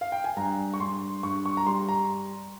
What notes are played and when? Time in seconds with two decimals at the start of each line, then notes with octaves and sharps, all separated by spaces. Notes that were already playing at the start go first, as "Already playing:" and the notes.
0.01 F5
0.12 G5
0.24 G#5
0.37 G2 A#5
0.74 C#6
0.80 G2 C6
1.23 G2 C#6
1.46 C#6
1.57 A#5
1.66 G3 C6
1.89 A#5